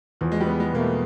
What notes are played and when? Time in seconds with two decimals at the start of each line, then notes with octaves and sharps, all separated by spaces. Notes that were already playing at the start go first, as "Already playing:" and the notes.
0.21 E2 F3
0.32 G#3
0.40 G3
0.46 B3
0.60 G#3
0.73 B2 A#3
0.79 A3